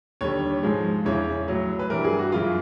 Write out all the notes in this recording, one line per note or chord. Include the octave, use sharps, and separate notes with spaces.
D#2 D3 G3 C#5
G#2 F3 G#3
E2 C#3 E3 C#5
A2 F#3
B4
G2 E3 G3 A#4
G#4
F#4
F#2 C#3 E3 G#3 F4